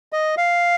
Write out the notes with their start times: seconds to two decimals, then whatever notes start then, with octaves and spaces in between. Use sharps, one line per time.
0.13 D#5
0.37 F5